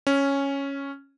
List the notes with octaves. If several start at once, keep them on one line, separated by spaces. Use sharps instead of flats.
C#4